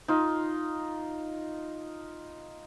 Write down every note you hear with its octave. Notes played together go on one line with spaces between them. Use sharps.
D#4 F4